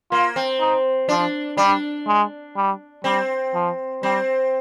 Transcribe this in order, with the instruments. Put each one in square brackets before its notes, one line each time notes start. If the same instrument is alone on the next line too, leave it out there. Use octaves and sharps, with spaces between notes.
[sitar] A#3 [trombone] F4
[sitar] C4
[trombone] D#4
[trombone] F3 [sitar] D4
[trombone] G3 [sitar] D4
[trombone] G#3
G3
[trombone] G3 [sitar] C4
[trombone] F3
[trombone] G3 [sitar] C4